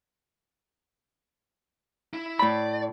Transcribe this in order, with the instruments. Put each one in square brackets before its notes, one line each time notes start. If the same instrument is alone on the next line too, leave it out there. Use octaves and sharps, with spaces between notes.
[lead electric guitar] E4
[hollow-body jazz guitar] A2 B5 [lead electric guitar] D5